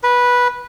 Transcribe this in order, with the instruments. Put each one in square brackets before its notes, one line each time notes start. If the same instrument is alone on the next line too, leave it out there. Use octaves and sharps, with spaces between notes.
[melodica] B4